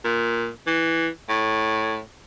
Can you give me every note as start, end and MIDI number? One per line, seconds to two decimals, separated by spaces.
0.05 0.49 46
0.67 1.07 52
1.29 2.00 45